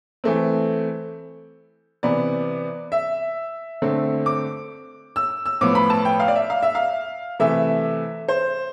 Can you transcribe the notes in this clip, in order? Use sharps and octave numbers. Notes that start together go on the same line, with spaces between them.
E3 A3 C4
C3 E3 B3 D5
E5
D3 A3 C4
D6
E6
E6
A2 F3 B3 D6
B5
A5
G5
F5
D5
E5
F5
E5
F5
C3 E3 A3 E5
C5